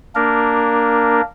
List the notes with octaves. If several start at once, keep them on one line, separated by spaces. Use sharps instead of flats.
A#3 D4 A#4